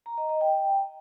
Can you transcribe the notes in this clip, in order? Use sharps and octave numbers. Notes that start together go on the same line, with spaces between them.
A#5
D#5
D#5
G5